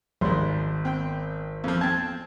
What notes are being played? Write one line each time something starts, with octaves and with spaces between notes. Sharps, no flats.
G#1 G#2 G3 C6
C4 G5
F2 F3
C4 A5 G#6